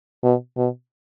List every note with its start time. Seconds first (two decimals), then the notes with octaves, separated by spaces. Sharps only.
0.23 B2
0.57 B2